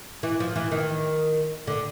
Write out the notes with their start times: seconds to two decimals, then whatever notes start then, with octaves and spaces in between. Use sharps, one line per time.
0.23 E3
0.40 F3
0.56 E3
0.72 D#3
1.67 D3